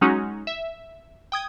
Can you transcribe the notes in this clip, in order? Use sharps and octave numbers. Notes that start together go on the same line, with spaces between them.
F#3 G#3 C#4 D#4 F#4
E5
G5 D#6 G#6